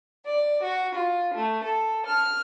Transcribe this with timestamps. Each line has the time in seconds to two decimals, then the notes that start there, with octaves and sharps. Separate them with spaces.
0.24 D5
0.62 F#4
0.94 F4
1.34 A3
1.63 A4
2.05 F6